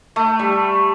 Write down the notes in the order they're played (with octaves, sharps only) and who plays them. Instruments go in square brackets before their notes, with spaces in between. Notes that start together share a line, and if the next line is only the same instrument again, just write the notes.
[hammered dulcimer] A3
G3